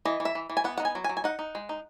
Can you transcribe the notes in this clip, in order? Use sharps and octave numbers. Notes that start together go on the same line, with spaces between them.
E3 D#5
E3
E5
E3
E3
G#5
B3 F#5
D#4 F#5
G#5
F#3
G#5
F#3
G#5
D#4 F#5
D#4
G#3
D#4